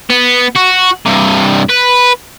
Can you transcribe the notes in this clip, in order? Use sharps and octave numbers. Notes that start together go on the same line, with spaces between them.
B3
F#4
G2 C3
B4